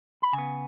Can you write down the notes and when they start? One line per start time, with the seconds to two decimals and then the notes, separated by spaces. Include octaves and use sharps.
0.22 B5
0.33 C#3 G#5
0.38 B3